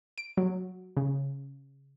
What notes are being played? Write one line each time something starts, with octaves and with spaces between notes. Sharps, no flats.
D7
F#3
C#3